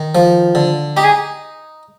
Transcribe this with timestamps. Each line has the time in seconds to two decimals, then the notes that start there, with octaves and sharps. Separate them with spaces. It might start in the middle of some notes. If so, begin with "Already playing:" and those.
Already playing: D#3
0.15 F3
0.55 D3
0.97 D#4 G4
1.04 G#4